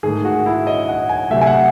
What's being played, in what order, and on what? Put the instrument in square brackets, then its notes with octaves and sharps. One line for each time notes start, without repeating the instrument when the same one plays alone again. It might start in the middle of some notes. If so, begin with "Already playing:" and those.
[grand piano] G#2 D#3 A3 G#4
F#4
E4
D#5
F#5
G#5
C3 F#3 A3 E5
G#5
F#5